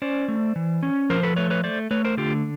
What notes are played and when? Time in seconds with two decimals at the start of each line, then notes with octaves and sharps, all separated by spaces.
0.02 C#4 C5 D5
0.28 A3
0.56 E3
0.83 C#4
1.10 F3 A#4 C5
1.23 A4 B4
1.36 A3 B4 C#5
1.50 B4 C#5
1.64 A3 C5 D5
1.91 A3 B4 C#5
2.04 A#4 C5
2.17 D3 F4 G4